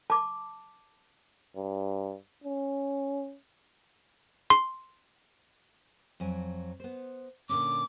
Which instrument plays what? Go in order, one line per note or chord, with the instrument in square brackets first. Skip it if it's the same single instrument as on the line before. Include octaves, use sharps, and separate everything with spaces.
[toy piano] A5 D6
[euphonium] G2
C#4
[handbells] C6
[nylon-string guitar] F2 F#3 G#5
B3 C5
[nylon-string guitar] A#2 D3 C#4 [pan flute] D6